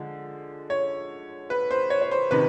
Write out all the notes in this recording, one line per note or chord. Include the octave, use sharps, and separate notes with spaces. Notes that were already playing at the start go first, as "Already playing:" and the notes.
Already playing: D3 F3 G#3
C#5
B4
C5
C#5
C#5
C5
C3 D#3 B4